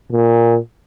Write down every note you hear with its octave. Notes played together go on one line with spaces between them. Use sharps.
A#2